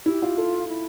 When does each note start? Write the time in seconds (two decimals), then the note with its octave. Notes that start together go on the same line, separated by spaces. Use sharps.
0.06 E4 G4
0.22 F4
0.37 F4 A4
0.68 E4